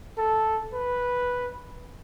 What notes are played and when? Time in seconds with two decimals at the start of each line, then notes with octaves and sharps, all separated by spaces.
0.18 A4
0.73 B4